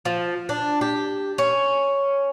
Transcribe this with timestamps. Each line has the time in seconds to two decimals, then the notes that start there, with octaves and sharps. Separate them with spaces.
0.05 F3
0.49 D4
0.81 G4
1.38 C#4